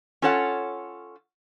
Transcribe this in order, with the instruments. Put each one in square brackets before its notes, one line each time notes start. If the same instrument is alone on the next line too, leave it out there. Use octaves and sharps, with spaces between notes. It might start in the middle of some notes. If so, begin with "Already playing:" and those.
[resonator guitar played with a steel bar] C#4 F4 A4 C#5 F#5